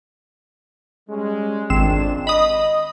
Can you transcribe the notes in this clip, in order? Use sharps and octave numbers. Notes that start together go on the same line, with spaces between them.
G3 G#3 C#4
G#1 F2 D#3 C4 D4 E7
D#5 B5 D#6